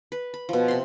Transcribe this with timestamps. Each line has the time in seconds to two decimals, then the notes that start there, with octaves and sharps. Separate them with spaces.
0.12 B4
0.34 B5
0.49 B2 F3
0.68 C3 C6